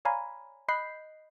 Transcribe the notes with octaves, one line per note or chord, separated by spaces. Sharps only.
C#5 D5 F5 G#5 A#5 B5
D#5 B5 F#6 G6 B6 C7